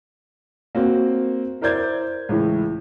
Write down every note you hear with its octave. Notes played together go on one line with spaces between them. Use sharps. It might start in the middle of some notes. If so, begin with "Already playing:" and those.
A#3 C4 F#4
E4 A#4 C5 D5 G6 G#6
C#2 A2 E3